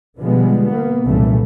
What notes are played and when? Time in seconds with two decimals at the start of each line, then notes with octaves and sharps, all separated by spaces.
0.20 B2 D3 F3 G3 G#3 B3
0.66 A#3 B3
1.06 C2 F#2 A#2 C#3 E3 A3